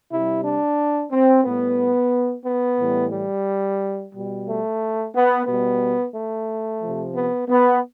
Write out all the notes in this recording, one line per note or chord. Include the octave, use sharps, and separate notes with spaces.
C3 G3 E4
D4
C4
A2 G3 B3
B3
A2 E3 G3
G3
B2 G3
A3
B3
B2 G3 B3
A3
C3 F3
B3
B3